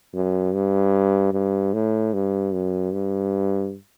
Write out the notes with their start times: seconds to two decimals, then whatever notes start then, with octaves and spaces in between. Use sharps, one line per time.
0.14 F#2
0.54 G2
1.33 G2
1.73 A2
2.13 G2
2.53 F#2
2.93 G2